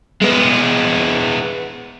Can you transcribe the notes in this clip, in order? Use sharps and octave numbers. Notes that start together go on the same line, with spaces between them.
G#3 B3